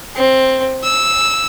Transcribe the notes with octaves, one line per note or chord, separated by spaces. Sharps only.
C4
E6